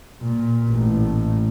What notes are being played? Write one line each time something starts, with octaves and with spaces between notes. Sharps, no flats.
A#2
A1 A2